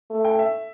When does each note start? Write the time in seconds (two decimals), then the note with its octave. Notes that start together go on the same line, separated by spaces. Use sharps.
0.10 A3
0.25 G5
0.39 E5